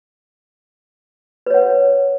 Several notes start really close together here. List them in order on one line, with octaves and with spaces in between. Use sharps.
B4 C#5 F#5